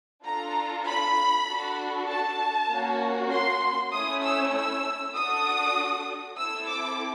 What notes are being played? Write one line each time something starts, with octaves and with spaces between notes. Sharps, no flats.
D4 F4 A4 A#5
B5
D4 F#4 A4
A5
A#3 C#4 F#4
C6
A3 C#4 E4 D#6
E6
E6
D4 F#4 A4 D#6
C4 E4 A4 E6
D6